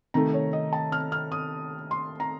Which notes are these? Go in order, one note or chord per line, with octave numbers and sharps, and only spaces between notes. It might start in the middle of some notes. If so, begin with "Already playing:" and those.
C3 D#3 A3 A#5
C#5
D#5
A5
F6
F6
D#6
C6
A#5